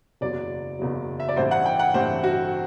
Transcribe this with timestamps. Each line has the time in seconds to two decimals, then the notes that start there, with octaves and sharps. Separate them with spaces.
0.21 F#1 E2 B2 F#3 D5
0.79 F#1 E2 B2 F#3
1.20 E5
1.29 D5
1.36 A1 G2 E3 A3 C4 C5
1.51 F#5
1.66 G5
1.79 F#5
1.94 A1 G2 E3 A3 C4 C5
2.24 F#4